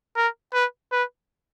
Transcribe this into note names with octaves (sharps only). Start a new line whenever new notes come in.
A#4
B4
B4